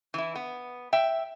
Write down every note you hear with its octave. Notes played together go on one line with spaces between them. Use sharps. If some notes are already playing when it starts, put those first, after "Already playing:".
E3 E4
B3
E5 G5